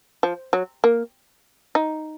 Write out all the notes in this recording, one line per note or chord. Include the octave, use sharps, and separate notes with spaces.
F3
F#3
A#3
D#4